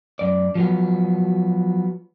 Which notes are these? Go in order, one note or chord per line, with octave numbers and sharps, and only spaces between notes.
F#2 D5
F3 F#3 B3